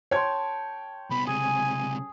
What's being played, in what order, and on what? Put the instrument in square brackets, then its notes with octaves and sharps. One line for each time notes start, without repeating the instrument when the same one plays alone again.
[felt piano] C#5 G#6 [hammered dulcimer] G5 A5 C6
[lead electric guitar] C2 B3 [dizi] B5
[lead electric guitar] C#2 C3 [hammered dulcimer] G#4 [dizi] G#5